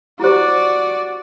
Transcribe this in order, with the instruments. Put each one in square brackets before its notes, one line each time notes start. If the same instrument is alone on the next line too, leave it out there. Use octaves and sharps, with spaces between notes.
[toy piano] E4 G4 C5 [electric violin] F#4 D5